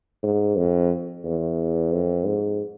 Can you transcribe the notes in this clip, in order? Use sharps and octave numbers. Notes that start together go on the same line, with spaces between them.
G#2
F2
E2
F2
G#2